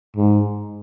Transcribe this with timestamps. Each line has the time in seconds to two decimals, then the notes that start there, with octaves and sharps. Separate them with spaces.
0.16 G#2